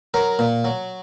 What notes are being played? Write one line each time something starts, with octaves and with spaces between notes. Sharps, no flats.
F#3 A#4
A#2
F#3